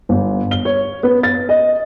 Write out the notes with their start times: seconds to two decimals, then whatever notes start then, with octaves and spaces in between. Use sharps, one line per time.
0.09 G1
0.51 G7
0.65 C#5
1.03 B3
1.23 A6
1.49 D#5